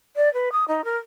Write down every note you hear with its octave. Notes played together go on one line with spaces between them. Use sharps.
D5
B4
D#6
D#4
A#4